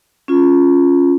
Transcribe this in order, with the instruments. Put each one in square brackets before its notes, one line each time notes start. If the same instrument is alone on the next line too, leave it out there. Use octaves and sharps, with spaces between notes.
[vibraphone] C#4 F4